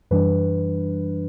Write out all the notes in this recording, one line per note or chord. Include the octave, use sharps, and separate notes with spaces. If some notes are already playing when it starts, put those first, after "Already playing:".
F#2 E3 G3 D4 B4